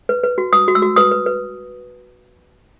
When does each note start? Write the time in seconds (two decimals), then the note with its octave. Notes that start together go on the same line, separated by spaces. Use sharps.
0.09 B4
0.24 B4
0.38 F#4
0.53 B4 D#6
0.68 F#4
0.75 E6
0.82 F#4
0.96 B4 D#6
1.11 B4
1.26 B4